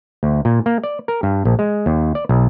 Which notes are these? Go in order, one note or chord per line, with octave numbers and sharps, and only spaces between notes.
D2
A#2
A#3
D5
A#4
G2
A#1
G#3
D#2
D5
B1